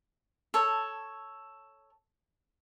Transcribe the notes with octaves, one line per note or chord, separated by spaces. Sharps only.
A4 C#5